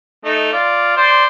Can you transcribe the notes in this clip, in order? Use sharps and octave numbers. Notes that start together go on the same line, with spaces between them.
A3 D#4
F4 D5
C5 D5